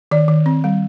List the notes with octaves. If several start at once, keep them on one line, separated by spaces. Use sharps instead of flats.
D#3 D5
D#3
C4
G3